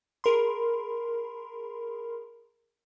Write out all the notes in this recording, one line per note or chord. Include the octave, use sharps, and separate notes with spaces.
G#4 A#4 B5 C6